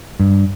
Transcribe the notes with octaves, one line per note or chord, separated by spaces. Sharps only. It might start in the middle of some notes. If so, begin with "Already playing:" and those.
G2